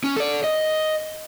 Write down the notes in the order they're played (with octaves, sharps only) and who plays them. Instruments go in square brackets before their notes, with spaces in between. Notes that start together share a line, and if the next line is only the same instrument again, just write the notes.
[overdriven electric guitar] C#4
A4 D5
D#5